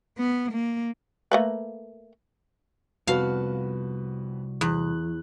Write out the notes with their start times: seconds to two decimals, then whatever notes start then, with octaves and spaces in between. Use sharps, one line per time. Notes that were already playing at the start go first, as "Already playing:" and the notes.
0.18 B3
0.52 A#3
1.32 A3 A#3 B4
3.07 C2 F2 B3 F#4 B4 F5 A5
4.61 E2 F#6